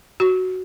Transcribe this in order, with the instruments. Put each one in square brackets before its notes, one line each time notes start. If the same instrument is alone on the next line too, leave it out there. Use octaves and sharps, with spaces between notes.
[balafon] F#4